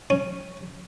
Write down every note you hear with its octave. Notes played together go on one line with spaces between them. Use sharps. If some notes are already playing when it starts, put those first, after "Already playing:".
C#4